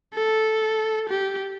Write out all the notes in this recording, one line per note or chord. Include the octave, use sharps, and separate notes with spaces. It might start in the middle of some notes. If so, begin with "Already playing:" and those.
A4
G4